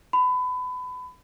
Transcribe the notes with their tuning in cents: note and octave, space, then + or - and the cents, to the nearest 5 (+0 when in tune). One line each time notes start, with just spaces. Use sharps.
B5 +25